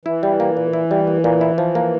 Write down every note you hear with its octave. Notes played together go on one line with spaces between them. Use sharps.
E3 E4
G3
A#3
A#2
E4
G3
A#3
A#2
E4
F3
A#3